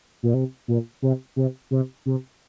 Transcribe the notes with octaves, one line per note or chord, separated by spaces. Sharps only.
A#2
C3
A#2
C3
C3
C3
C3